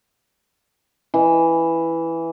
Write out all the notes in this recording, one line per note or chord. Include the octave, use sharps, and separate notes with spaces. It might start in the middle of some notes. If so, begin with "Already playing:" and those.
E3